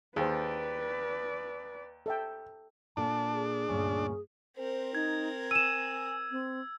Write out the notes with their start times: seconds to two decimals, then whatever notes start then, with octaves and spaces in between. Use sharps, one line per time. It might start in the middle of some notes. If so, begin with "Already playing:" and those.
0.16 D#2 G#4 B4 C5 D5
2.06 A4 E5 G5
2.97 A#2 D4 A4 A5
3.33 G#4
3.69 D2 G2 A#2 C#4
4.57 C4 A#4 C5
4.95 D#4 G#6
5.51 G#5 E6 D#7 E7
6.31 C4